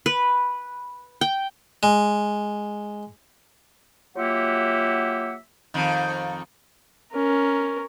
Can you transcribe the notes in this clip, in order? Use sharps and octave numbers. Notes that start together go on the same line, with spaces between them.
B4
G5
G#3
F#3 A#3 F4 G4 E5 F#5
F2 D#3
C#4 A#4